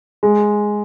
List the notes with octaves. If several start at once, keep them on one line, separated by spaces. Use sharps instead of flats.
G#3